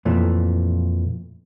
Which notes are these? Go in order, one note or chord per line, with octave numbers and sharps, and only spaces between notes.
F2 A#2 E3 A3